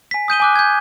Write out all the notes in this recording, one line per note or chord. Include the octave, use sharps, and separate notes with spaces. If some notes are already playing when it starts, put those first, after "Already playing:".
G#5 B6
D#6 G6 D#7 G7
G#5 D6 F#6
G6 G#6